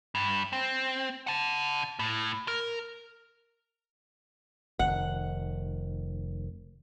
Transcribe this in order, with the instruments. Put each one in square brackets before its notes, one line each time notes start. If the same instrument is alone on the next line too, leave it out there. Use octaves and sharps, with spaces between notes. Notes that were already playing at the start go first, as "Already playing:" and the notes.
[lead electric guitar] G2
C4
F#5 A5
A2
A#4
[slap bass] F1 D#3 [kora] F#5